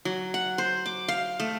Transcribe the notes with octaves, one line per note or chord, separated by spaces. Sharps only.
F#3
F#5
C5
D6
F5
A3